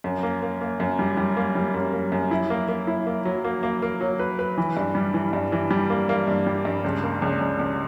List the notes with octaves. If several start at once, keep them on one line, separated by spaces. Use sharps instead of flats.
F#2
A#3
A#3
A#3
F#2
G3
G3
A#3
G3
F#2
A#3
F#2
E4
A#3
A#3
E4
A#3
F#3
A#3
A#3
A#3
F#3
B4
B4
E3
G2
G3
E3
G2
E3
G3
A#3
A#3
G2
G3
G2
C#2
A#3
C#2
C#2
C#2